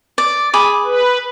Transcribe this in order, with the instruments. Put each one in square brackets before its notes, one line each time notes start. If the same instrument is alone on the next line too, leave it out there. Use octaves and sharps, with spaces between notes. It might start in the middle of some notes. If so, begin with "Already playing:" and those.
[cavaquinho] D5
G#4 B5 D6
[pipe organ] B4